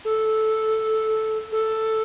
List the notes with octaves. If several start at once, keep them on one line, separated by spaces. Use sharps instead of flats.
A4
A4